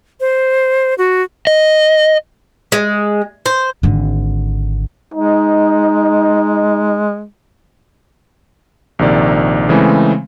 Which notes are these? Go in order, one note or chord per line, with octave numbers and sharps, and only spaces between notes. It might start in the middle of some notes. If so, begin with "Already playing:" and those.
C5
F#4
D#5
G#3
C5
G#1 D3
G#3 D#4
A#1 C3 D#3 D5
C#3 E3 G#3 A3 C4